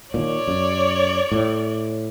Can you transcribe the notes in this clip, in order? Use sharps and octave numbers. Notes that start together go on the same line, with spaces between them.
A#2 D#3 C#5 D5
F#2
A2